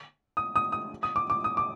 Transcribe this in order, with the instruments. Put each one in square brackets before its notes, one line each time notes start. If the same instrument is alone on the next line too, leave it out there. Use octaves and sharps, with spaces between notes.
[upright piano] D#6
D#6
D#6
D#6
D6
D6
D#6
D6